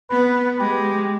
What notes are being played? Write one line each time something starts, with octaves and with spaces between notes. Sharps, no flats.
B3 B4
G#3 G4